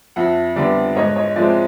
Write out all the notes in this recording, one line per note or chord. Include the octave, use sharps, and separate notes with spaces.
F2 E5 F#5
D3 G3 B3 D4 D5 E5
G#2 C#5 D#5
C#5 D#5
F3 G#3 C4 D5 E5